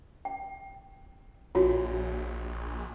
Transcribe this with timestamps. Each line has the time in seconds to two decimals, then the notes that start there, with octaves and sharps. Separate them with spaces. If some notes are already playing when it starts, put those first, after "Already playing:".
0.25 G5
1.55 A#1 F4 F#4 C#5